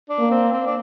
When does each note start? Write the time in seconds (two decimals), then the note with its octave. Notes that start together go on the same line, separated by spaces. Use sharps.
0.09 D4
0.19 A#3
0.30 C4
0.52 C4
0.67 D4